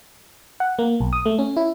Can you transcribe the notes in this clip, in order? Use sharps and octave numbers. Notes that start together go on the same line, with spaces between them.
F#5
A#3
B1
D#6
A3
C#4
E4